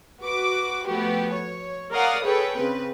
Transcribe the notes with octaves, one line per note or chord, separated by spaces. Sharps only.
F#4 B4 D6
F3 A3 B3 F#4 G4
C#5
A#4 C#5 D5 F5 F#5 D#6
G#4 A4 B4 C#5 G5
C#3 C4 B4